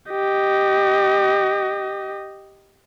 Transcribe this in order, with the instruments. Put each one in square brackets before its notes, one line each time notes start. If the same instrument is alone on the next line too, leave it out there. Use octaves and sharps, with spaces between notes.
[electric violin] G4 D#5